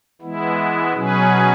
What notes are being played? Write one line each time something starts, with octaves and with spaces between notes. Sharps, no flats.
E3 G#3 B3 E4
B2 F#3 C#4 G#4 B4